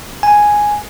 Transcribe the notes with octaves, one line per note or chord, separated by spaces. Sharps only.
G#5